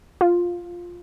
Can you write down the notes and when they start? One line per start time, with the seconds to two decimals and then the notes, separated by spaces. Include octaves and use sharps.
0.21 F4